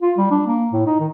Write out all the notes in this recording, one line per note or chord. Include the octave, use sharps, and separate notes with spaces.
F4
G3
D4
A#3
A2
D#4
D#3